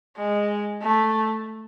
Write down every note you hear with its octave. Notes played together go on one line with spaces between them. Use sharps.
G#3
A3